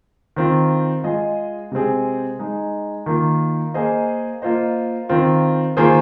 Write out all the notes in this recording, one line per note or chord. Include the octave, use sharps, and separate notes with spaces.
D#3 C4 F4
G#3 F4 G#4 D#5
C3 G#3 C4 G#4
G#3 D#4 G#4
D#3 A#3 F4
A#3 G#4 C5 D#5
A#3 F4 C5 D#5
D#3 C4 F4
D#3 A#3 F4 G#4 C5